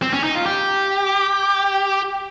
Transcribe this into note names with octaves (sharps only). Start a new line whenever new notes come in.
C4
C#4
D#4
F4
G4